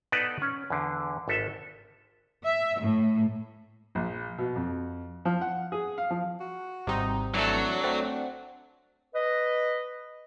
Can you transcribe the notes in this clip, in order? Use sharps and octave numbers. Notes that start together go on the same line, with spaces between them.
B3 D#4 A4 B4 D5 F#5
C#4
E2 D3
G#1 A4 E5
E5
A2
A#1
B2
F2
F3
F#5
G#4
F5
F3
F#4
G#1 C3 G3 C4 D#4
E3 F#3 A3 D4 A4
A3 C4 F#5
B4 D#5